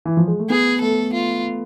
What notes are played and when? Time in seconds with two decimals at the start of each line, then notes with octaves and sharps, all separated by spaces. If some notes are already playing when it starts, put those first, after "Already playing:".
0.05 E3
0.17 F3
0.27 G#3
0.39 A3
0.50 B3 G#4
0.81 A3 A4
1.14 F4